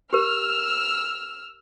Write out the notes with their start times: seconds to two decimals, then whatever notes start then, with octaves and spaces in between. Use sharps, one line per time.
0.13 G4 A#4 E6 F6